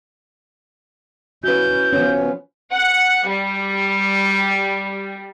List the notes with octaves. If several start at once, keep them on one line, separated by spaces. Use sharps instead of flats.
C#4 E4 F#4 B4 G6
F3 B3 C#4 C#5
F#5
G3